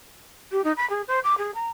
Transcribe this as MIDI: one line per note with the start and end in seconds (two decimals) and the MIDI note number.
0.51 0.63 67
0.64 0.72 63
0.76 0.88 83
0.89 1.02 68
1.07 1.19 72
1.23 1.35 86
1.38 1.51 68
1.54 1.69 82